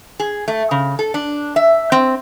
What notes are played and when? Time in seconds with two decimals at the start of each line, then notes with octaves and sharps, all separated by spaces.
0.20 G#4
0.48 A3
0.71 C#3
0.99 A4
1.14 D4
1.56 E5
1.92 C4